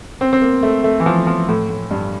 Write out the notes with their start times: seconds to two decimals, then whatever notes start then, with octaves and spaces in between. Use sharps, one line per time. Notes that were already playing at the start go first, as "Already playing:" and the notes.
0.21 C4
0.33 C4
0.42 A#3
0.63 A3
0.84 A3
1.00 E3
1.06 F3
1.27 F3
1.49 A2
1.70 A2
1.91 G2